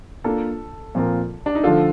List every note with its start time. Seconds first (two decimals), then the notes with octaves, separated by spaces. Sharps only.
0.24 A#3 D4 F4 A4
0.95 A#2 F3 C4 F4 A#4
1.46 D4
1.55 D#4
1.64 D3 F3 A3 D4 F4 A4